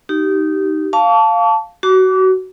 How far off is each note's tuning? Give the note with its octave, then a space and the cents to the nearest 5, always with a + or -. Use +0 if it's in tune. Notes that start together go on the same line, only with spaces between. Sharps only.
D#4 +0 G4 -20
F5 +0 A5 +0 C#6 +45
F#4 +20 D6 -25